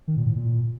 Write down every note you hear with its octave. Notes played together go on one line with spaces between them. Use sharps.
D#3
A#2
A2
A#2